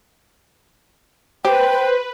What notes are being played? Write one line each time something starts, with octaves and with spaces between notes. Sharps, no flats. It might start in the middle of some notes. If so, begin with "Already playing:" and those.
G4 B4 C5 G5